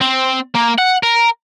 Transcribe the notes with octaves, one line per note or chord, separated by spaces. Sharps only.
C4
A#3
F#5
A#4